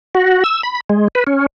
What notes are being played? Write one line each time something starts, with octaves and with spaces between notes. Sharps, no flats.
F#4
E6
B5
G#3
B4
C#4